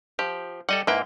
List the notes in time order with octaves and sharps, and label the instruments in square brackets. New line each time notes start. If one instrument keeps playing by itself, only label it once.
[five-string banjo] F3 [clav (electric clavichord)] G4
[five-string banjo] G3 [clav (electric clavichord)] A4 D#5 F#5
[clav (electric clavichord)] G#2 A#3 G5 [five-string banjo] E4 B4